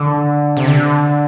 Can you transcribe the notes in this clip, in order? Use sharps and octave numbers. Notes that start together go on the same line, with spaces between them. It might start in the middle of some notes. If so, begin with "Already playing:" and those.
Already playing: D3
C3
D3